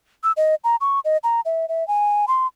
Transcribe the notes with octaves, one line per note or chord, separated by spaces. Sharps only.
E6
D#5
A#5
C#6
D#5
A#5
E5
E5
G#5
C6